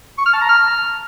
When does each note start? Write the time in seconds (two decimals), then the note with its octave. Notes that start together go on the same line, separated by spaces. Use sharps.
0.18 C#6
0.26 F6
0.34 A5
0.41 A#5
0.49 F6